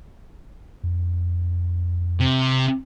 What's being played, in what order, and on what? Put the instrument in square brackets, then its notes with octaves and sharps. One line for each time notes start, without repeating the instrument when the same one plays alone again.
[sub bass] F2
[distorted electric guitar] C3